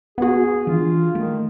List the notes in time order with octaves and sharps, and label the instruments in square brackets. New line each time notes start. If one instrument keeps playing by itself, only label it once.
[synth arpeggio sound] B3 F#4 [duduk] G#4
[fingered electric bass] E3 D4 [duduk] F4
[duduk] D#3 [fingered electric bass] A3